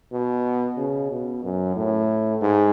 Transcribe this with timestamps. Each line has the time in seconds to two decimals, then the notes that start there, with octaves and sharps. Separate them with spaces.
0.12 B2
0.77 C#3
1.11 B2
1.43 F#2
1.76 A2
2.42 G#2